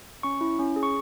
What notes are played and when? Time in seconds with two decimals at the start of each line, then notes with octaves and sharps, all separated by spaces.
0.23 C#4 C#6
0.41 E4
0.59 C#4
0.76 G#4
0.83 C#6